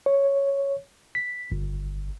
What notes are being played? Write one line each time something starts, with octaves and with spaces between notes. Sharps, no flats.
C#5
B6
G1